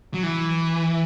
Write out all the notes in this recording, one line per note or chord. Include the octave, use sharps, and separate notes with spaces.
F#3
E3